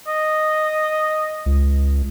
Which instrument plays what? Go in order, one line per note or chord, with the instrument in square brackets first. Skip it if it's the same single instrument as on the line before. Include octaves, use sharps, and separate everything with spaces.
[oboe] D#5
[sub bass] C#2